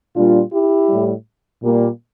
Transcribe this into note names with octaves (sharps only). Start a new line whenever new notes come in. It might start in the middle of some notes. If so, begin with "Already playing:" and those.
A#2 G3 D4 F4
E4 G4
A2 G3
A#2 G3 A#3